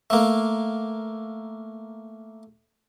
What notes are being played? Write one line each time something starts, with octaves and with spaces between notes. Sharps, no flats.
A3 A#3